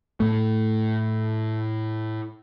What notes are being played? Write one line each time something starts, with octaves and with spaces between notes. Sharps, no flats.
A2 A3